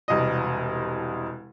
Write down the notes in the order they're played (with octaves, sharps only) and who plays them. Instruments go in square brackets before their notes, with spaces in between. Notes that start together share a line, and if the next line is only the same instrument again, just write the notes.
[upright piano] E1 C2 D#5